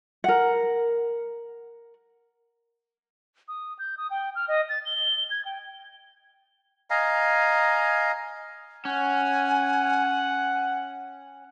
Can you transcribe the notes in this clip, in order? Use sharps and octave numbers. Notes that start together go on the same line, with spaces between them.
A#4 F#5
D#6
G6
D#6
G5
F6
D#5
A6
G7
G#6
G5
D#5 F5 G#5 A#5
C#4 F#5 G#5